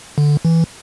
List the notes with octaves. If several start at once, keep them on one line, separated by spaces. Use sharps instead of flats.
D3
E3